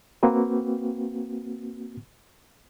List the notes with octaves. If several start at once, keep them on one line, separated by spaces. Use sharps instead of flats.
A#3 C4 F#4 B4